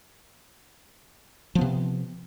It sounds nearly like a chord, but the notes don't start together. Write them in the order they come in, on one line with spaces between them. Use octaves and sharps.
F3 B3 C3